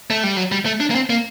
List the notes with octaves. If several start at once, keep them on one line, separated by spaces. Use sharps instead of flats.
A3
G3
F#3
G3
A3
D4
A#3
C4
A#3